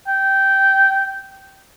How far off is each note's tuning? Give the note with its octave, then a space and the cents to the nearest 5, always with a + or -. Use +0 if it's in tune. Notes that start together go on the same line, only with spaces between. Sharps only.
G5 -15